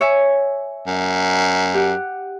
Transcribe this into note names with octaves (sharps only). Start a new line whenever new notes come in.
C#5 E5 G#5
F#2
G4 F#5